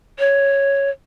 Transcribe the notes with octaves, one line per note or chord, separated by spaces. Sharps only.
C#5